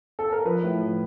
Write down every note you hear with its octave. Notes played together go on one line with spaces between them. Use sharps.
A4
A#4
F3 B4
A2
F3